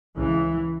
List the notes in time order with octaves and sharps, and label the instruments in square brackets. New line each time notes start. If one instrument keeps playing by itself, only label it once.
[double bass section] C#2 C#3 E3